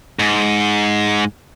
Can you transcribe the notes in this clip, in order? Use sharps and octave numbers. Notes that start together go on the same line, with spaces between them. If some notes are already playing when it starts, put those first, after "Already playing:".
G#2